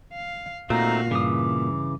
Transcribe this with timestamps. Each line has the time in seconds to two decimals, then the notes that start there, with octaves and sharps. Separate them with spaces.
0.13 F5
0.70 A#2 A3 C4 D#4 F#4 F5 A#5
1.11 G2 C#3 E3 D6 D#6